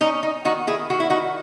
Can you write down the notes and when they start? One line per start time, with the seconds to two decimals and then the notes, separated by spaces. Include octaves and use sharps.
0.01 C#4 D#4
0.23 D#4
0.45 D#3 D#4 F#4
0.67 E4 G#4
0.90 D#3 F#4
1.00 E4
1.10 D#4 F#4